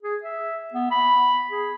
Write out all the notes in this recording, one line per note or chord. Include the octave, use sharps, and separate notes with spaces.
G#4
E5
B3
B5
G#4